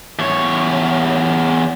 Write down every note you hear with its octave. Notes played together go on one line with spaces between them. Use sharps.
E2 C#5